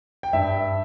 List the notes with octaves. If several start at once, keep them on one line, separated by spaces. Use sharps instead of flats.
G5
G2 E5